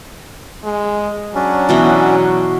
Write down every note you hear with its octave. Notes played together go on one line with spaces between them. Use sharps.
G#3
F#3 C#4 D4
B2 E3 F#4